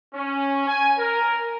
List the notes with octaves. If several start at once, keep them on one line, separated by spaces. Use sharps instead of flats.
C#4
G#5
A#4